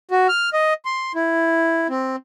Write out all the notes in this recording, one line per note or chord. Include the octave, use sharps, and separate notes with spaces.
F#4
F6
D#5
C6
E4
C4